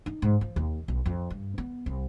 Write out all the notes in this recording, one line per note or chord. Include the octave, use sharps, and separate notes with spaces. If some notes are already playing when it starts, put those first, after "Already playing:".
D#4
G#2
F3
D#2
B1
F2
G2
B3
C2